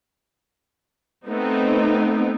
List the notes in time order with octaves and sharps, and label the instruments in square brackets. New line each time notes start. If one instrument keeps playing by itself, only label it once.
[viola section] A3 B3 C4 D#4